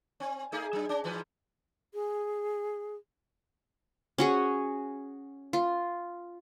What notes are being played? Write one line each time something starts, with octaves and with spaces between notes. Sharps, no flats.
C4
A3 D#4 G#4
F#3 D4
C#4
G#2 E3 B4
G#4
C#4 F#4 G#4
F4